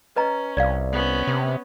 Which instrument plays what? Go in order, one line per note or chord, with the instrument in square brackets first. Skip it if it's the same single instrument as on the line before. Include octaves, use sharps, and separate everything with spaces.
[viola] C#4 [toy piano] B4 D#5 A#5
[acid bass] C2 [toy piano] D5 F5
[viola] B3 C#4
[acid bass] C3